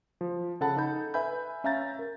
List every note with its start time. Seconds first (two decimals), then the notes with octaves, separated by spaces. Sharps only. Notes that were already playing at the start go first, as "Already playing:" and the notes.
0.21 F3
0.61 C#3 A4 F#5 A5 B5
0.77 D#4 A4 B5 G6
1.14 B4 E5 G#5 B5 G6
1.64 C#4 E5 F5 A#5 G6 A6
1.99 A#4